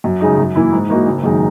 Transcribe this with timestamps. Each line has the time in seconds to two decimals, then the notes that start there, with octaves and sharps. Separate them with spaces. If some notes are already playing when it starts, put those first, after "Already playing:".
0.04 F#2
0.21 C#3 G#3 D#4
0.38 F#2
0.56 E3 A#3 E4
0.72 G#2
0.90 E3 A#3 D#4 F#4
1.06 F#1
1.24 F#2 D#3 G#3 D#4